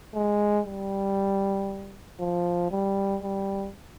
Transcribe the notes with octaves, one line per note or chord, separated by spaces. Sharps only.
G#3
G3
F3
G3
G3